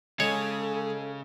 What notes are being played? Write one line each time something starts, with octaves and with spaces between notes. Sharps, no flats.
C#3 G#3 A4 C#5